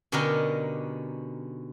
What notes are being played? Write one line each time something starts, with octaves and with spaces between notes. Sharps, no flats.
B2 D3 C#4 D#4 G4 A#4